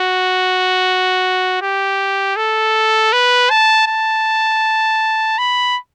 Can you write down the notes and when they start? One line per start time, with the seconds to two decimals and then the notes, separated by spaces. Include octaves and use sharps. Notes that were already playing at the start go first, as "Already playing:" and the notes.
Already playing: F#4
1.62 G4
2.36 A4
3.12 B4
3.50 A5
3.87 A5
5.38 B5